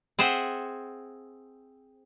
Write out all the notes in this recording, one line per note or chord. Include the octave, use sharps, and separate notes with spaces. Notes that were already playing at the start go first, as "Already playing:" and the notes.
C4 G#4 C5 E5 F#5